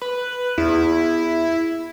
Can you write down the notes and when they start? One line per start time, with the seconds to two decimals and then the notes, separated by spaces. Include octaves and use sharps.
0.02 B4
0.58 E2 E4